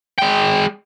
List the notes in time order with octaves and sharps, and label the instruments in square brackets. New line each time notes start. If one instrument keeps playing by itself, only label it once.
[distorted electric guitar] G#3 G5